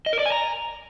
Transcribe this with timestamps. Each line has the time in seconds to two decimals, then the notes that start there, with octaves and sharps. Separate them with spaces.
0.06 D#5
0.13 A#4
0.19 D5
0.26 G#5
0.32 A#5